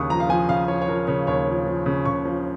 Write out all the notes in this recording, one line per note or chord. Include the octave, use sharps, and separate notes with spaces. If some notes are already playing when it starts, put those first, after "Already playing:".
Already playing: D#2 C#3 C#6 D#6
F3 A#5
F5
F3 G#5
C#3 F5
F3 C#5
C#5
F3 A#4
C#3 C#5
D#2 C#5
F3
F3
C#3
C#3 C#6
F3